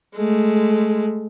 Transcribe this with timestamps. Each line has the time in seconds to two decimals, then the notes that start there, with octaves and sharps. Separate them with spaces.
0.17 G#3 A3